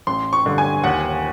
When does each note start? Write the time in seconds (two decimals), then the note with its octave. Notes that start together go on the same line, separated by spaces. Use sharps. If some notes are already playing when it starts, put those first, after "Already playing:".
0.07 A1 C6
0.33 C#6
0.45 G2 D3
0.58 G#5
0.84 D#2 F#5